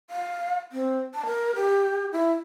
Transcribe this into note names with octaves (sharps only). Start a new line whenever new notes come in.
F5
C4
A5
A#4
G4
E4